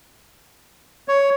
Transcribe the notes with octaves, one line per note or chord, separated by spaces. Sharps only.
C#5